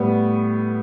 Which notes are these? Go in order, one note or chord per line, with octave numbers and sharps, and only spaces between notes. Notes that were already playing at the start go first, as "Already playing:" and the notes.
Already playing: A2 G3 B3